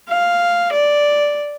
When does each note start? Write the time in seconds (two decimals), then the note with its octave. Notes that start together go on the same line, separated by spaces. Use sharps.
0.09 F5
0.72 D5